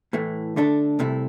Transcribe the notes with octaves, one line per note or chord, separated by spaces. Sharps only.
A2 E3 A3
D3 A3 D4 A4
C2 C3 A3 E4